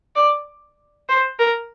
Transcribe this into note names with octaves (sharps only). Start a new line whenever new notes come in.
D5
C5
A#4